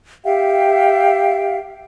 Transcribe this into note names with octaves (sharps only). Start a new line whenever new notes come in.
G4 E5 F5 G5